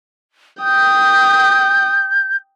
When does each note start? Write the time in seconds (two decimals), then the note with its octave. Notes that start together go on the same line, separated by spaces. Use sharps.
0.63 G5 D#6 G6